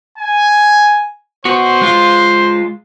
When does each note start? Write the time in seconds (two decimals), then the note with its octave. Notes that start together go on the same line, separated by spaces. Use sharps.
0.18 G#5
1.45 B3 F#4 C5
1.82 G#3 F4